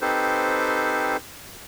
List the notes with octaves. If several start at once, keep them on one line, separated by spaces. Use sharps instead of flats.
C4 D#4 G4 A4 B4 C5